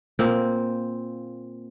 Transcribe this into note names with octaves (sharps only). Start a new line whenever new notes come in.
A#2 A#3 C4